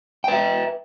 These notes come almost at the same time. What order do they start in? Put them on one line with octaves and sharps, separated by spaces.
G5 B4 E5